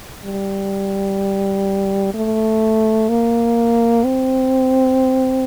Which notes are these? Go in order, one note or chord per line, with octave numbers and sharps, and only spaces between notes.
G3
A3
A#3
C4